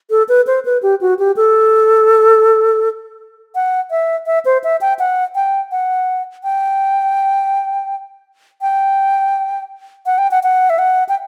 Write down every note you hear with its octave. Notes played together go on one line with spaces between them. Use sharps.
A4
B4
C5
B4
G4
F#4
G4
A4
F#5
E5
E5
C5
E5
G5
F#5
G5
F#5
G5
G5
F#5
G5
F#5
F#5
E5
F#5
G5